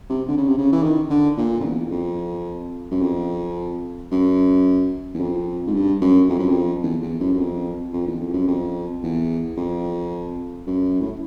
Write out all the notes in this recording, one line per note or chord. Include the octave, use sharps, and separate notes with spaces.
C3
D3
C#3
C3
C#3
E3
D#3
D3
A#2
F2
E2
F2
F#2
F2
F#2
E2
F2
G#2
G2
F#2
F2
F#2
F2
E2
E2
F#2
F#2
F2
F2
E2
F2
F#2
F2
E2
F2
F#2
A2